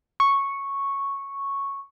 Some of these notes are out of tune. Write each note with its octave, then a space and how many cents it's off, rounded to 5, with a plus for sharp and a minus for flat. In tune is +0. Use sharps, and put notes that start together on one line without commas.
C#6 -5